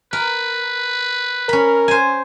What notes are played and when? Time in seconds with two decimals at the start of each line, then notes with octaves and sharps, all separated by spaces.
0.13 A#4 B4
1.49 C#4 A#4 B5
1.88 C5 G#5